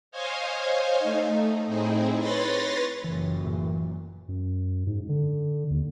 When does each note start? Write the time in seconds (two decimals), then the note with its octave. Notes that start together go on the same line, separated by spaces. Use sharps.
0.11 C5 C#5 D#5 F5 G#5
0.99 A3 D#4
1.66 A2 C4 D#4 E4 G#4
2.20 B4 C#5 B5 C6 A6 A#6
3.04 F#1 F#2 A#2 E3
3.45 A2 E3
4.28 F#2
4.87 G#2
5.09 D3
5.70 D#2